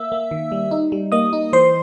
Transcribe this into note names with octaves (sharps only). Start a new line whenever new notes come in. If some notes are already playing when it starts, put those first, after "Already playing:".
Already playing: A#3 E5 E6
A#3
D#3
G3
D#4
G3
A#3 D#5 D#6
D#4
E3 C5 C6